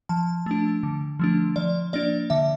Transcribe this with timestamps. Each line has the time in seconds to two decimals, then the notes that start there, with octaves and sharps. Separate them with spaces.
0.09 F3 A5
0.46 A3 D4
0.83 D3
1.19 F3 A3 D4
1.56 F3 D5
1.93 A#3 D4 D5
2.30 D3 E5